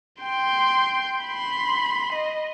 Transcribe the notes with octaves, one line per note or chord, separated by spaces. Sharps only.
G5 C6
B5 C6
D#5